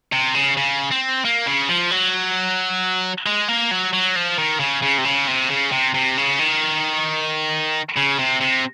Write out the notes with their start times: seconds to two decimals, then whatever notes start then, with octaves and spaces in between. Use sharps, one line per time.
0.12 C3
0.35 C#3
0.57 C#3
0.91 C4
1.25 A#3
1.47 C#3
1.69 F3
1.91 F#3
3.26 G#3
3.48 A#3
3.71 F#3
3.93 F#3
4.16 F3
4.38 D#3
4.60 C#3
4.82 C#3
4.98 C3
5.05 C#3
5.28 C3
5.50 C#3
5.72 C3
5.94 C3
6.18 C#3
6.40 D#3
7.97 C#3
8.19 C3
8.41 C3